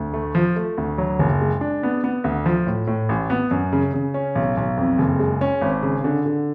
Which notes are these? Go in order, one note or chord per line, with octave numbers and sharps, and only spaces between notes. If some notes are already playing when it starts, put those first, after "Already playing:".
Already playing: D2
A3
F3
A3
D2
F#3
F#1
G#3
D4
B3
B3
D2
F3
A2
A2
A1
B3
F#2
C#3
C#3
C#4
B1
B1
F2
F#1
G#3
C#4
G#1
C#3
D3
D3